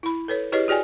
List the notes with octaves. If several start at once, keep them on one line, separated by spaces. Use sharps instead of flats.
E4 B5
A4 B4 C#5
E4 G4 G#4 B4 C#5 D#5
F#4 G#4 D5 G5 G#5